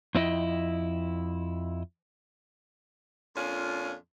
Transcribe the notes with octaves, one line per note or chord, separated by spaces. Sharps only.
F2 C4 E4 D#5 G5
F2 A#2 C#4 D4 F4